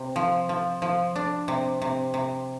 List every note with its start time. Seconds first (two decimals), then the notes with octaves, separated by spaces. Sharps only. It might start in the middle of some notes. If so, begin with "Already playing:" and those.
Already playing: C3
0.16 F3
0.49 F3
0.82 F3
1.16 D4
1.48 C3
1.82 C3
2.14 C3